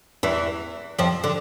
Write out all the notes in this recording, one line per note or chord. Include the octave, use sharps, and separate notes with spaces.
E2 E3
F2 F3
D3